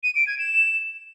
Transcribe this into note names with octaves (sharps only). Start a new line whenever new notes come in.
D#7
D7
G#6
E7